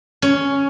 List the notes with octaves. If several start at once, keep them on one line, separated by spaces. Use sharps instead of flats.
C#4